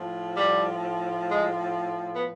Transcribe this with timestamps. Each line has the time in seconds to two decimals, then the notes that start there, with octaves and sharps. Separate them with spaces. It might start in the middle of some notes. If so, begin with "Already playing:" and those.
Already playing: A2 F3
0.36 G3
1.29 G#3
2.14 B3